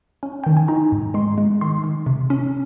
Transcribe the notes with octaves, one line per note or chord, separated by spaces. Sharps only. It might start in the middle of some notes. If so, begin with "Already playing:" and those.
C#4
D#3 G5
G#5
D#4 A#5
G#2
G#3 C6
G#3
D#3 C6
D#3
C3
C#4